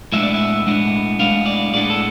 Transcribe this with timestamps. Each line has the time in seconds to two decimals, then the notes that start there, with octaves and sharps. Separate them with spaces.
0.12 A2 G#3 B3 D4 E5
0.23 D5
0.34 E5
0.67 A2 G#3 B3 D4
1.19 A2 G#3 B3 D4 F5
1.46 D5
1.73 A2 G#3 B3 D4 D5
1.90 A4